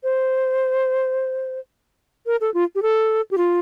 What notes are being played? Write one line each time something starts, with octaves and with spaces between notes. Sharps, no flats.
C5
A#4
A4
F4
G4
A4
G4
F4